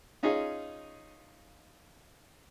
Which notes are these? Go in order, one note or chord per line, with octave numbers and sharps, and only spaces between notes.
C#4 D#4 F4 G#4